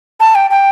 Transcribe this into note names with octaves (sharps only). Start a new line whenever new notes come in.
A5
G5
G5